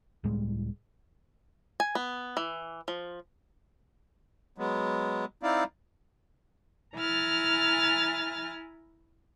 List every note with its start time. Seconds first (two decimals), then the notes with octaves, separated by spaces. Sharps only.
0.24 C#2 A2 G3 G#3
1.80 G#5
1.95 B3
2.37 E3
2.88 F3
4.58 F#3 G#3 B3
5.43 C4 D#4 E4 D5 F5
6.96 E4 G#5 A#5 F6 A6